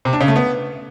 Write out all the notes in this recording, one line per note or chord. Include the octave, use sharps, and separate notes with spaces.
C3
D4
C#3
A3
B3